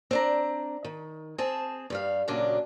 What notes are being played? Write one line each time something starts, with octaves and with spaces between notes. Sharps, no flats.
C4 D4 A#5
D#3
C4 G#4 A5
G2 G3 F5
D2 A#2 C#3 F#3 D4